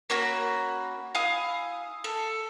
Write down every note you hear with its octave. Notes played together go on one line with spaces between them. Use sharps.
A#3 C#4 F#4 B5
E4 F5 G#5 D#6
A4